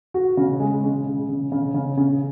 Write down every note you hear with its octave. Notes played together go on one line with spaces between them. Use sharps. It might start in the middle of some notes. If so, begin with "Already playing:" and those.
F#4
C#3
G#3
C#3
C#3
C#3
C#3
C#3
C#3